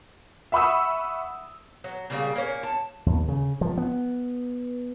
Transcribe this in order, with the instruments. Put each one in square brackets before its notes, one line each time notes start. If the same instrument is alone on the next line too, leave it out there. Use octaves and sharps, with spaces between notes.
[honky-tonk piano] E5 F#5 B5 C#6 D#6 E6
[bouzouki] F#3
C#3 G3 A#3
A#3 C#4
A5
[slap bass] D#2
C#3
F3
B3